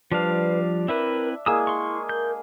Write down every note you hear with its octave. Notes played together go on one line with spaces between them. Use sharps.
F3 G3 D4 B4 F5
C4 E4 A#4 B4 E5
G#3 A#3 E4 G#4 D#6 E6
C6 C#6
A#4 G6